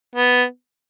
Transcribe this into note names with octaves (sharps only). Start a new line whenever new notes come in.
B3